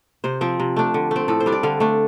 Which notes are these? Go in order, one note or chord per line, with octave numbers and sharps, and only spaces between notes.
C3 C5
F3 C4
C3
A3 D4
D3
A3 C4
A2 A4
C5
G3 D4
D5
D3 F5
A3 D4